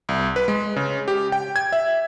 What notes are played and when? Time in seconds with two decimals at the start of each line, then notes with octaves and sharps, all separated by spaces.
0.09 C2
0.36 B4
0.48 G#3
0.76 C#3
1.08 G4
1.32 G5
1.56 G#6
1.73 E5